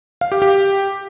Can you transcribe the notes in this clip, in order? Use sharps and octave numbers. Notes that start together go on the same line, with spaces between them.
F5
G4
G4